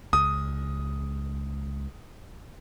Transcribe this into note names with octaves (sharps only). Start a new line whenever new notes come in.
C#2 D#6